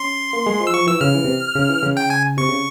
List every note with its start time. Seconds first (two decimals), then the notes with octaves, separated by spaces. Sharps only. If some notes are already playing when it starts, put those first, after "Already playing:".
Already playing: C#4 C6
0.33 A#3
0.46 G#3
0.60 F3
0.67 E6
0.73 F3 C#6
0.87 E3 E6
1.01 C#3 F6
1.15 E3
1.24 C3
1.55 C#3
1.69 E3
1.83 C#3
1.97 G5
2.10 G#5
2.37 C3 C#6
2.49 C#3